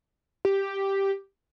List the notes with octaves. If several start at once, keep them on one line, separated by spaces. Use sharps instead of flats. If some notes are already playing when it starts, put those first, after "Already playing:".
G4